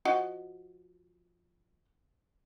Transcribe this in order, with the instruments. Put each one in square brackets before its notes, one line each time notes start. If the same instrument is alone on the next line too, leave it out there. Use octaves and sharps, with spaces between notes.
[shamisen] F3 F#4 D#5